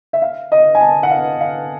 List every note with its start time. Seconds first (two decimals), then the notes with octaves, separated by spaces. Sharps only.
0.13 E5
0.22 F5
0.52 D#5
0.75 G#5
0.81 A5
1.03 F#5
1.11 F5
1.41 F5